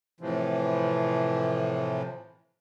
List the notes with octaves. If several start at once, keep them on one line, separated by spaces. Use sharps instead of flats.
A2 C3 E3 F3